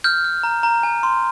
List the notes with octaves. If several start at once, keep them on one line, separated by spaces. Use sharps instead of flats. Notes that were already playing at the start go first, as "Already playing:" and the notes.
F6 G6
F6
A#5
A#5
G#5
C6